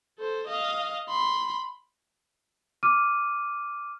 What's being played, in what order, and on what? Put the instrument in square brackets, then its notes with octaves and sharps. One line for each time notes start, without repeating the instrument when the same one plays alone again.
[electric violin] A4 C5
D#5 F5
B5 C6
[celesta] D6 F6 D#7